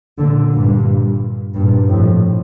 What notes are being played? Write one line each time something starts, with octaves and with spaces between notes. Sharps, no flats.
A#2 D3
G2 A#2
G2 A#2
F2 A2